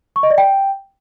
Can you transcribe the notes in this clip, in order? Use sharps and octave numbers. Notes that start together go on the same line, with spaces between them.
C#6
D#5
D5
G5